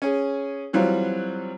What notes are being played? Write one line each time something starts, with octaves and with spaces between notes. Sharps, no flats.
C#4 G#4
E3 F#3 G3 C4 F4